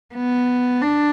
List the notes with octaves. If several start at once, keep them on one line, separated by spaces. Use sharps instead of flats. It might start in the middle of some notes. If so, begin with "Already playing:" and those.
B3
D4